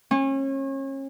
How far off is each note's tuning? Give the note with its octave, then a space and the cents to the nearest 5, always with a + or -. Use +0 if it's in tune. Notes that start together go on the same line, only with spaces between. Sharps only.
C#4 -35